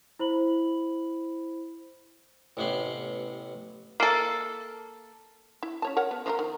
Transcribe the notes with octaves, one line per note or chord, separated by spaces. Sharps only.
E4 C5 B5 F#7
A1 C3 B3 C#4 B5 C6
A#3 A4
E4
C#4 C#5 A5
A#4 C#5 F#5
B3
F3 F4 A#4
D#3